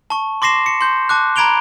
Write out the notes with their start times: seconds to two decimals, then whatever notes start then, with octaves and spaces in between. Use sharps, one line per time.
0.10 A5 C#6
0.42 C6 D6 A#6 C7 E7
0.66 C#7
0.81 C6 G6
1.09 A5 D6 F#6
1.36 A#5 B5 G#6 D7 F7 G7